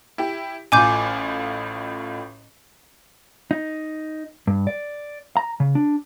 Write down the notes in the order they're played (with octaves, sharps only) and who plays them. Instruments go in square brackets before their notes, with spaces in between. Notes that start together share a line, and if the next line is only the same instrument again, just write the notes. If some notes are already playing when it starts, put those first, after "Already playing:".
[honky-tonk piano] E4 G4
[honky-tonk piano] A1 A2 F4 [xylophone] G#5 D6 G6
[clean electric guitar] D#4
G2
D5
A#5
C#3
D4